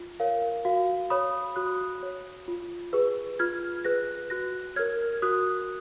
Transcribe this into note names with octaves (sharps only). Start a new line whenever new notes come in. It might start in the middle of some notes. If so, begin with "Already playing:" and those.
Already playing: F4
A#4 C#5 F5
F#4 F5
C#5 B5 D#6
F#4 D#6 F#6
C#5
F4
G#4 B4
F4 F6 G#6
G#4 B4 F#6 A#6
F#4 F#6 A#6
A#4 C#5 F6 G#6
F#4 D#6 F#6